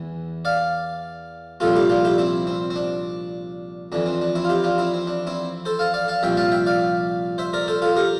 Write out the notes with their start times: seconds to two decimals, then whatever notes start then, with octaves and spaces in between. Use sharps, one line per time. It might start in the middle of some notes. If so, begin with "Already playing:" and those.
Already playing: E2 E3
0.45 D5 F5
1.60 C2 A#2 F3 F4 A4
1.76 E4 G4
1.89 D4 F4
2.05 E4 G4
2.18 C4 E4
2.47 C4
2.70 C4
2.76 D4
3.92 F2 E3 D4
4.06 C4
4.22 D4
4.35 C4 E4
4.45 F4
4.49 E4 G4
4.64 D4 F4
4.78 C4 E4
4.94 C4
5.07 D4
5.27 C4 E4
5.65 A4 C5
5.79 F5 A5
5.94 D5 F5
6.08 F5 A5
6.23 C2 A#2 F3 E5 G5
6.37 F5 A5
6.52 E5 G5
6.66 D5 F5
7.38 C5 E5
7.53 A#4 D5
7.68 A4 C5
7.82 F4 A4
7.96 G4 A#4